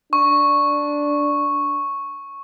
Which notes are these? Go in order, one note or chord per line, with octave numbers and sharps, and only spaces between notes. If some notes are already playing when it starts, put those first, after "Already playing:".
D4 C#6